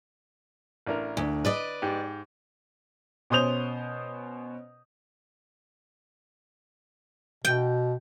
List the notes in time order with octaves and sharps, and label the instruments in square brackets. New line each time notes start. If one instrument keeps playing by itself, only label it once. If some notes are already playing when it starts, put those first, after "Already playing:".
[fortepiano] A1 D4 A#4
[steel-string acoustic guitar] D2
B4 D5 D#5
[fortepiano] G#2 G4
[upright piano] B2 C#4 C5 D#6 G6 F7
[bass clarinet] B2 [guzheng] G5